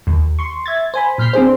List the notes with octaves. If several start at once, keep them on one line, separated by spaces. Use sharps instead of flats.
D#2
C6 C#6
E5 G#6 A6
C5 G#5 B5
A#2 F6 G6 B6 C7
C4 D4 G#4 C5